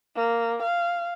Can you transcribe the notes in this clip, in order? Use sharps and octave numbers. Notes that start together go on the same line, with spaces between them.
A#3
F5